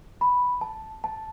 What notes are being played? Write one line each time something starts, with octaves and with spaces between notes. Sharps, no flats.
B5
A5
A5